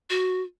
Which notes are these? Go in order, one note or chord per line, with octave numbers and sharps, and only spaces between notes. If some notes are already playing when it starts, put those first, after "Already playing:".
F#4